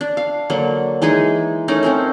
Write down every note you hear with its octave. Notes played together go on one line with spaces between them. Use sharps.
D4
F5
D3 F#3 A#3
E3 G#3 D#4 G#4
A3 C#4 D#4 A#4
C4 C#4 A#4